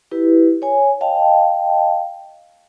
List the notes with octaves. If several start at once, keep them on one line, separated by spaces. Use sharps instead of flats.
E4 G4 B4
C#5 G#5
D#5 F5 G5 A5